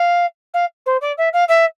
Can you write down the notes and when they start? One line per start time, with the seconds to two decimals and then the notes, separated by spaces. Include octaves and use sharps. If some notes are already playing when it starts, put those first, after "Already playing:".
Already playing: F5
0.53 F5
0.86 C5
1.01 D5
1.17 E5
1.33 F5
1.48 E5